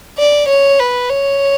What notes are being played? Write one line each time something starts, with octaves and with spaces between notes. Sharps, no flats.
D5
C#5
B4
C#5